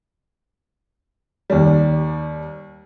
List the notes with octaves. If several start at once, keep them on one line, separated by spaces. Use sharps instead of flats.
D#2 G3